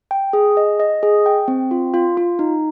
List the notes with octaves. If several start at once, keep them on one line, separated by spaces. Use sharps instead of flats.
G5
G#4
D#5
D#5
G#4
G5
C4
F4
F4
F4
D#4